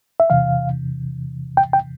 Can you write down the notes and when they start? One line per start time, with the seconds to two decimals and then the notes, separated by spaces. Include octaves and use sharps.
0.20 E5
0.30 E2 C3 E3 F5
1.57 G5
1.73 G5